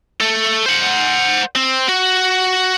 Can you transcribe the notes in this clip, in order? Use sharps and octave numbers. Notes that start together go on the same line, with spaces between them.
A3 A4
C5 F#5
C4
F#4